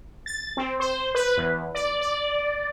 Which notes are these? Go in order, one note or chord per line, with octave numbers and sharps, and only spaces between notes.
A6
C4
C5
B4
E2
D5
D5